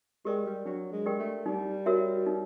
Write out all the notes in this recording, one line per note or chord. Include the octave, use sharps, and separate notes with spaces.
G#3 G4 A#4 D5 G5
G3
F#3 D4
G#3
G4 A#4 D5 G5
A3
G3 D#4
F#4 A#4 C#5 E5
D#4